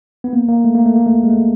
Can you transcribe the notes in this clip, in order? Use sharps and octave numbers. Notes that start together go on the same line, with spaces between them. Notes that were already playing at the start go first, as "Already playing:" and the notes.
B3
A#3
A#3
A3
A#3
A3
A#3
A3
G#3
A3